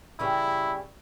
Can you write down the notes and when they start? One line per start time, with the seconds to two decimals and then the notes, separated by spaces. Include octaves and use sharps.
0.19 C#3 E3 G3 E4